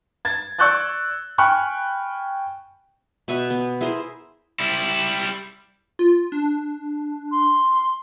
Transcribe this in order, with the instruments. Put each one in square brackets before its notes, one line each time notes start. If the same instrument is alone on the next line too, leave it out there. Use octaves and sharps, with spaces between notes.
[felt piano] G#6 A6
D5 C#6 E6 F#6 G6 A6
G5 G#5 B5 C#6 F6 F#6
[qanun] B2 B4 E5 C#6
B3
E4 G#4 A#4 C5
[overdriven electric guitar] G3 E4
[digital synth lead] F4
D4
[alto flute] C6